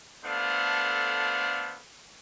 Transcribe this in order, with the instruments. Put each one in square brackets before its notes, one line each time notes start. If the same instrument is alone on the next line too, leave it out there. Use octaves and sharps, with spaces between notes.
[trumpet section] A3 B3 D4 A4 C5 F5